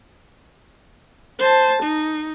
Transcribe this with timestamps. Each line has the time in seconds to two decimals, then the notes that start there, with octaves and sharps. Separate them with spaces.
1.39 C5 A5
1.83 D#4